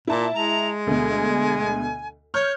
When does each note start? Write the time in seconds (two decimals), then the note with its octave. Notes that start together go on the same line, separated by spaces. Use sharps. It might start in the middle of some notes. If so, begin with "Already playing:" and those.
0.07 A#2 E4 A5
0.34 G#3 A#5
0.87 D2 B2 G#5
2.34 C#5 C#6 F6 G6